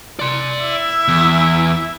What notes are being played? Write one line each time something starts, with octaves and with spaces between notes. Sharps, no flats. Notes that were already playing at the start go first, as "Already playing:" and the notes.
D5 C6
E4 E5
E2